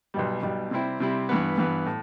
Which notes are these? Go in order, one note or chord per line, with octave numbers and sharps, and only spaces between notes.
B1 B2 G3
B1 B2 G3
C3 G3 C4 E4
C3 G3 C4 E4
G2 E3 B3
G2 E3 B3
A2